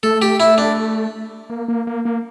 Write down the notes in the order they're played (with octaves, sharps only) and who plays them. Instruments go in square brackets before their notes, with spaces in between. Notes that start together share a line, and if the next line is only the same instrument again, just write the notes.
[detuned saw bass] A3 [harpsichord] A4
[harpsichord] G4
E4
D4
[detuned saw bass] A#3
A#3
A#3
A#3